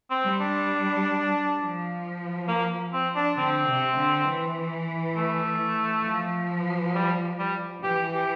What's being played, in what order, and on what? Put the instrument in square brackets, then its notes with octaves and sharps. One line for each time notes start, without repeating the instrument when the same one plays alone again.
[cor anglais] C4
[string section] G3
[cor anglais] D4
[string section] F3
[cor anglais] A#3
C4
D4
[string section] D3 [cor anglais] C4
[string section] C3
D3
E3
[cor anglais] A3
[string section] F3
[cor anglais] G3
G3
[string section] E3 [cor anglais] G4
[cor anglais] G4